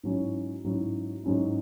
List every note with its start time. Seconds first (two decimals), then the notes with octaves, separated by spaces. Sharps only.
0.03 G#2 F#3 C#4 E4
0.64 G#2 F#3 C#4 E4
1.24 G#2 F#3 C#4 E4